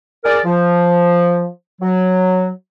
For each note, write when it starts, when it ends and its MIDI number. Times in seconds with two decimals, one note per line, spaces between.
0.24 0.38 68
0.24 0.38 70
0.24 0.38 74
0.45 1.47 53
1.81 2.49 54